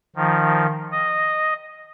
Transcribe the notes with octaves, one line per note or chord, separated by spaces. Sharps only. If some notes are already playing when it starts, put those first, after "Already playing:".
D#3 F3
D#5